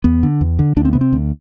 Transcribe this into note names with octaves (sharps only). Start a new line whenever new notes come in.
E2 B3
D3
E2
D3
D2 D4
C4
C3 B3
C4
D2